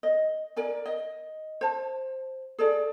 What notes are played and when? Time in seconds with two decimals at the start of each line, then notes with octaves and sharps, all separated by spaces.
0.03 D#5
0.56 A#4 D5 G#5
0.86 D#5
1.61 C5 A5
2.58 G#4 A4 D5